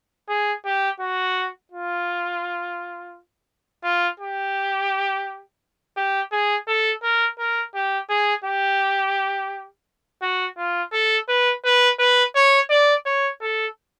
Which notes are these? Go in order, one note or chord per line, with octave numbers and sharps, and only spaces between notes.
G#4
G4
F#4
F4
F4
G4
G4
G#4
A4
A#4
A#4
G4
G#4
G4
F#4
F4
A4
B4
B4
B4
C#5
D5
C#5
A4